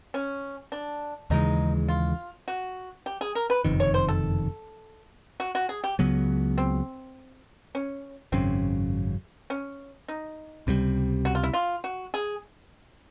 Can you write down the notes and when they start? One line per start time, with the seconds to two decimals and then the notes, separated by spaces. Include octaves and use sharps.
0.14 C#4
0.72 D4
1.30 D#2 C#3 E3 G#3 D#4
1.88 F4
2.48 F#4
3.06 G4
3.21 G#4
3.35 A#4
3.50 B4
3.64 F#1 F2 C3 D#3
3.80 C#5
3.94 C5
4.09 A4
5.40 F#4
5.55 F#4
5.69 G#4
5.84 G4
5.99 C#2 C#3 F#3 B3
6.58 C4
7.75 C#4
8.32 G#1 F#2 C#3 C4
9.50 C#4
10.08 D#4
10.67 C#2 C3 D#3 G3
11.25 F#4
11.35 F4
11.43 E4
11.53 F4
11.84 F#4
12.14 G#4